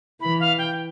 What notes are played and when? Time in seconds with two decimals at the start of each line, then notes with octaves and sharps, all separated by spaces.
0.21 E3 B5
0.40 F5
0.58 G5